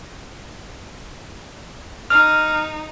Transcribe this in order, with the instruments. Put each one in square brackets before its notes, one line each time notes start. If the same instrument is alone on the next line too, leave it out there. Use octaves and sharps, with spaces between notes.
[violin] D#4 [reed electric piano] F6